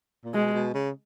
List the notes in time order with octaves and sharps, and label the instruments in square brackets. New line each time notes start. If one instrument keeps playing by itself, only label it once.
[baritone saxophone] A#2
[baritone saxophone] B2 [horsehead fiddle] G#3
[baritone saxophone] B2
C#3